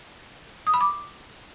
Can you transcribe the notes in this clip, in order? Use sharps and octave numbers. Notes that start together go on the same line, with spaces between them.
D#6
B5
D6